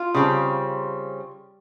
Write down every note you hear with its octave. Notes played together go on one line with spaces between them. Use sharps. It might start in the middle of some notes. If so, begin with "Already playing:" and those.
Already playing: F4
C#3 G3 C4